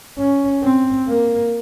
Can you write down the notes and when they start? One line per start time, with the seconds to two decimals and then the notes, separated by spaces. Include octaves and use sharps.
0.18 C#4
0.63 C4
1.08 A#3